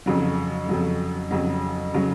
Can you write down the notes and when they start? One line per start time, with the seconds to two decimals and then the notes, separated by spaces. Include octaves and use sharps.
0.06 F2 C#3 F#3
0.69 F2 C#3 F#3
1.31 F2 C#3 F#3
1.94 C#3 F#3